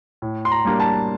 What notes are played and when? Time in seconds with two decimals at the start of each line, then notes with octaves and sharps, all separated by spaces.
0.22 A2
0.45 C6
0.51 A#5
0.65 G3 A#3 D4
0.80 A5